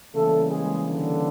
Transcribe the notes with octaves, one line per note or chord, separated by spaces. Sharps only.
C#3 E3 G3 A3 A#3 A4
G#3 G#4
D3 D4